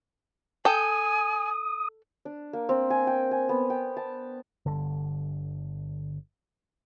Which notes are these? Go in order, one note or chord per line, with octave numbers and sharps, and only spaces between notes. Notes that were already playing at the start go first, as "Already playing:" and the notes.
A4 G5 G#5 D#6
D4
A#3
C4
G#5
G5
G#5
B3
G5
A5
G1 D3